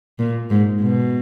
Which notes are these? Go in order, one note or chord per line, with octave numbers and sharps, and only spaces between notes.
A#2
G#2
B2